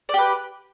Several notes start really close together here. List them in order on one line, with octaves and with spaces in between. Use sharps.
D5 G4 B4